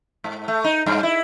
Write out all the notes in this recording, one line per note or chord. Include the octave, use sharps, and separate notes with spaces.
G#2
A3
D#4
G2
E4